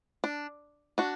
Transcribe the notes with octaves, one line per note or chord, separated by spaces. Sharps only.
D4
D4 F#4